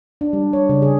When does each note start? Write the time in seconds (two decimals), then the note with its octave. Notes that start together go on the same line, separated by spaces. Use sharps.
0.21 D4
0.33 G3
0.53 C#5
0.69 C#3
0.82 G#4